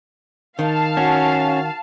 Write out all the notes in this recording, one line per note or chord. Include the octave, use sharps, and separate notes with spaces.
D#3 F5 A5
C#4 F#4